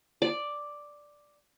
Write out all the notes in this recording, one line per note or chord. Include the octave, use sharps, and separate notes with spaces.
D5